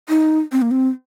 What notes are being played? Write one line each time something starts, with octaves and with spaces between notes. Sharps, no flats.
D#4
C4
A#3
C4